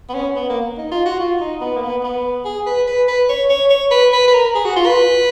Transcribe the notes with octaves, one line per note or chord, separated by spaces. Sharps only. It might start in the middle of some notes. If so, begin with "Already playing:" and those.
B3
C#4
B3
A#3
D#4
F4
F#4
F4
D#4
B3
A#3
B3
B3
G#4
B4
B4
B4
C#5
C#5
C#5
B4
B4
B4
A#4
G#4
F#4
F4
B4